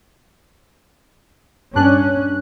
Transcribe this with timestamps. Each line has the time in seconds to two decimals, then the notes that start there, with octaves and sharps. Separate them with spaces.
1.75 G2 C#4 D4 F#6